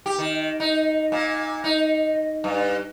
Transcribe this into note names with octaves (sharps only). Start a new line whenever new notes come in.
G4
D#3
D#4
A#2
D#4
G2